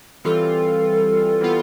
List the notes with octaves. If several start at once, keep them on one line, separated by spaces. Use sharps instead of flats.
E3 G3 C4 F4 A4
E3 G3 B3 F4